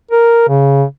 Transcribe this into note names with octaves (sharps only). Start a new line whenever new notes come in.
A#4
C#3